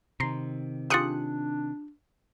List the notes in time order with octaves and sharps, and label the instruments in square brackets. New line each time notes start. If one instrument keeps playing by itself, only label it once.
[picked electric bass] C3 D#3 [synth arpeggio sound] A#5 C6
[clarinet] D4 [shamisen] F4 G4 G#4 [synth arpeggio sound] D#6 F#6 C#7